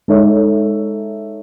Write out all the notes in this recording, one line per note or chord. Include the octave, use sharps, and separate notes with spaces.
G#3 D#4 A4 C#5 E5